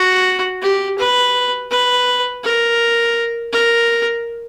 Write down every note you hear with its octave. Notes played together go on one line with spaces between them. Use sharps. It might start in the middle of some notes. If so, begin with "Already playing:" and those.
Already playing: F#4
G4
B4
B4
A#4
A#4